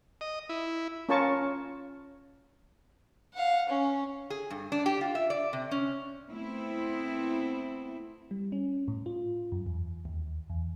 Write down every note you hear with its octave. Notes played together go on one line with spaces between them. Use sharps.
D#5
E4
C#4 F4 A#4 G#5 A5 C#6
F5 F#5
C#4
G#4
G2
D4
G4
F4
E5
D5
C3
C#4
A3 B3 C4 E4
G3
C#4
A2
F4
F#2
E2
D#2
E2